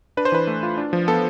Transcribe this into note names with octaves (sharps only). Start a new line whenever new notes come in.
D4 B4
C5
E3 B4
A3
F4
D4
F3
B3 A4